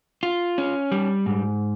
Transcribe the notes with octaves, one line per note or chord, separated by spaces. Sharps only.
F4
C#4
G3
G#2